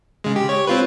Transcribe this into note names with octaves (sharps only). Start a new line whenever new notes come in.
C#3 G#3
G4
C#5
C4 F4 B4